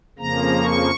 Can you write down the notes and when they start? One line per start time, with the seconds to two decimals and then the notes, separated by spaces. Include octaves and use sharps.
0.19 F2 C#3 F3 A#3 A#5
0.64 C#6